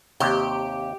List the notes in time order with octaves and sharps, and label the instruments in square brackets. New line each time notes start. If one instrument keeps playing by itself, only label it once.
[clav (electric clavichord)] D#2 C3 [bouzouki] G4